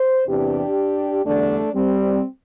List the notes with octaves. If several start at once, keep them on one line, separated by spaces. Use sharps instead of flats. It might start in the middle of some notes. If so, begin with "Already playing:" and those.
Already playing: C5
E2 C3 E3 D4 G4
E2 D3 G3 A3 D4
G3 C4